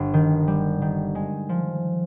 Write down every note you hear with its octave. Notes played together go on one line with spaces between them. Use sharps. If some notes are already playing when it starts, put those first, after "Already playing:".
Already playing: G1
D#3
G3
D#3
G#3
F3